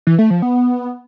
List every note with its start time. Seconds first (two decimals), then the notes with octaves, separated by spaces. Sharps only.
0.07 E3
0.19 A3
0.30 F3
0.42 B3